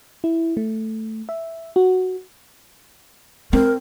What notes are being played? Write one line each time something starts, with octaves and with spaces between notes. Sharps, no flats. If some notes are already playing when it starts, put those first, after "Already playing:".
E4
A3
E5
F#4
C4 A#4